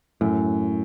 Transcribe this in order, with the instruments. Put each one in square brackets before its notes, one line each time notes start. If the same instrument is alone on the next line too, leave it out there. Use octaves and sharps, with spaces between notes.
[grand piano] F#2 [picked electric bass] A2